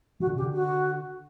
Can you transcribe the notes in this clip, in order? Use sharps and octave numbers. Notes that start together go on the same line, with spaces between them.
E3 F#4
D3
C#3 G4
D3
F#4